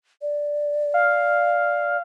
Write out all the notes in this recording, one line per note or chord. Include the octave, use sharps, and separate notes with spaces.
D5
F5